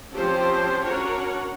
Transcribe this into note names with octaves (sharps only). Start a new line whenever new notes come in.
F3 C4 C#4 G4 C5 A5
C#4 D4 F#4 A#4 C#5 F#5